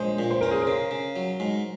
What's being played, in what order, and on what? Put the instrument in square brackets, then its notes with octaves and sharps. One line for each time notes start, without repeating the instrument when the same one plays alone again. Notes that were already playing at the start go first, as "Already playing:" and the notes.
Already playing: [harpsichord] A#1 G#3 [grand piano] C5 C#5
[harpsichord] A#2
[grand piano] C5
[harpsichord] C#4 [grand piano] A#4
[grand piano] G#4
A#4
[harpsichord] C#3
C#3
F#3
G#2